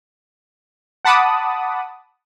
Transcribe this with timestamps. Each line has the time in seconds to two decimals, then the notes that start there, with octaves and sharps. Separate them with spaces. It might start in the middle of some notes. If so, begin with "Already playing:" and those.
1.05 F#5 A5 B5 D6 D#6